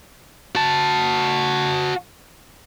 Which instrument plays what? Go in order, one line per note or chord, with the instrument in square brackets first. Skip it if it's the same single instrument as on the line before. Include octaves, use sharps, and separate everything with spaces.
[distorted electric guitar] F#4 A5